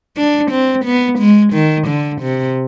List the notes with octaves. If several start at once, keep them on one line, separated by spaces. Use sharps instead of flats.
D4
C4
B3
G#3
D#3
D3
C3